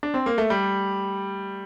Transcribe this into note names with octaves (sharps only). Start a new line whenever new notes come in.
D4
C4
A#3
A3
G3